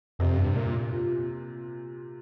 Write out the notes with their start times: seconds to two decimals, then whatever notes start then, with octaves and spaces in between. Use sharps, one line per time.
0.19 F2 C3
0.37 G2
0.56 A#2
0.91 A#2